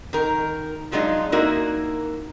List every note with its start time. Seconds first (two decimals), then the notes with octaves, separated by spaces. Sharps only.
0.13 D#3 A#4
0.91 F3 F#3 G#3 D4 D#4 F4
1.32 A#3 C4 D#4 E4 F#4 A#4